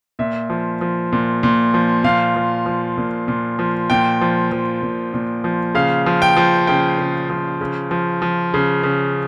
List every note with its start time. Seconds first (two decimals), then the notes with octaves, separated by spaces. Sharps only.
0.19 A#2 E5
0.50 F3
0.81 F3
1.13 A#2
1.43 A#2
1.74 F3
2.04 A#2 F5
2.36 F3
2.66 F3
2.97 A#2
3.28 A#2
3.59 F3
3.90 A#2 G5
4.21 F3
4.52 F3
4.82 A#2
5.14 A#2
5.44 F3
5.75 C#3 F5
6.06 F3
6.22 G5
6.37 F3
6.67 C#3 G5
6.99 C#3
7.30 F3
7.61 C#3
7.91 F3
8.22 F3
8.54 C#3
8.83 C#3